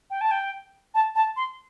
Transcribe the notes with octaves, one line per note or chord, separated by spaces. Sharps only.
G5
A5
G5
A5
A5
C6